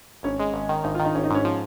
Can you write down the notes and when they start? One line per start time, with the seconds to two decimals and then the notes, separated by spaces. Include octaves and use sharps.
0.23 G#1 C#4
0.40 G#3
0.54 G#1
0.69 D#3
0.84 G#1 D#4
0.95 F4
1.00 D#3
1.05 D#4
1.15 G#1 C#4
1.24 D#4
1.30 G#2 C#4
1.45 F3